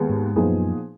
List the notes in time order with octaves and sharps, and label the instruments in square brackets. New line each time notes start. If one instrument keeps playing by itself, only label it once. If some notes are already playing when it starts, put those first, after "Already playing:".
Already playing: [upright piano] D#2 G#3 B3
[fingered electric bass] G#2
[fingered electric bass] F#2 [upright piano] A#2 F3 B3 D#4 G#4